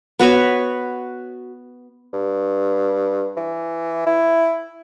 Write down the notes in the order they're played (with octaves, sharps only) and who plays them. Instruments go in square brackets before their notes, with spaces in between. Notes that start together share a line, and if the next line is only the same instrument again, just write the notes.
[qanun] B3 F#4 B4 C#5
[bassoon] G2
E3
E4